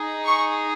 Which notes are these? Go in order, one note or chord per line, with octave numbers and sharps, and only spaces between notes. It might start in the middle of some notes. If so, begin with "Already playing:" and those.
Already playing: D#4 G#4
C#6